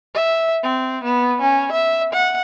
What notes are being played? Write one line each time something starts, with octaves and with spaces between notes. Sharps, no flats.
E5
C4
B3
C#4
E5
F#5